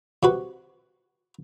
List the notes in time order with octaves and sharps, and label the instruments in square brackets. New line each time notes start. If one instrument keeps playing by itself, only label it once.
[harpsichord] C3 F#4 B4